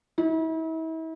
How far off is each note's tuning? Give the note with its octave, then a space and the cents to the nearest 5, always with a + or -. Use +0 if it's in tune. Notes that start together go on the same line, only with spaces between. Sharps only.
E4 -40